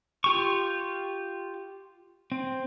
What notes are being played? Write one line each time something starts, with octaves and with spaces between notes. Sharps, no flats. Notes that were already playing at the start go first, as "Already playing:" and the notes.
F4 G4 C#6
C4